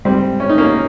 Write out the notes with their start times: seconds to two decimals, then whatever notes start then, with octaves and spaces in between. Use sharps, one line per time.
0.05 G#2 G3 C4
0.40 C#4
0.49 D#4
0.58 A#3 C#4